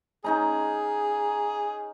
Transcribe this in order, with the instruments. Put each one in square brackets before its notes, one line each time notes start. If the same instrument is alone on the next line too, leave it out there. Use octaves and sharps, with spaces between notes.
[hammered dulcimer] C#4 D#4 A#5 [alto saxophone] G#4